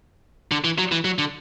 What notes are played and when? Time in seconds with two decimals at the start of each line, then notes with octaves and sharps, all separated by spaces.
0.51 D3
0.64 E3
0.78 F#3
0.92 E3
1.05 F#3
1.18 D3